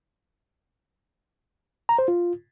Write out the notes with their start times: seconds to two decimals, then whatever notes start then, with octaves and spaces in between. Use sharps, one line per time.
1.89 A#5
1.99 C5
2.08 F4